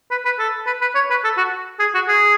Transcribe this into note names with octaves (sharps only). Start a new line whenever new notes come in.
B4
B4
A4
B4
B4
C#5
B4
A4
F#4
G#4
F#4
G#4